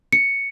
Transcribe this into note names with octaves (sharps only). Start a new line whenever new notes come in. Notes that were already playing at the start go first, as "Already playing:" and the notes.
C#7